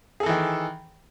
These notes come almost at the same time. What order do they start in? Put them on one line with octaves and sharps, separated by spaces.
G#4 A4 E3 D#3